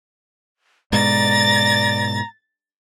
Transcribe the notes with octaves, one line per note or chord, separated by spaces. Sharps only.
G#2 B2 G#3 D5 A#5 A6